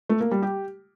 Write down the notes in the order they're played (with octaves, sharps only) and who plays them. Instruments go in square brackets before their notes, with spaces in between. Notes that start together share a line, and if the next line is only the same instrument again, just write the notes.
[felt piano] A3
A#3
G3
G4